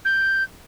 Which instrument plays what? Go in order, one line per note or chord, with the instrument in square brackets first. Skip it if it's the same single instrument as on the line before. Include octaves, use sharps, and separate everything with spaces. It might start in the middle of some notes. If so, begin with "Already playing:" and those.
[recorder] G6